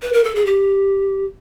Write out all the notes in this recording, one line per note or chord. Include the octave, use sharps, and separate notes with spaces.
B4
A#4
A4
G#4
G4